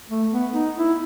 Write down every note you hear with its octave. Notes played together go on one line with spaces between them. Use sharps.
A3
B3
D#4
E4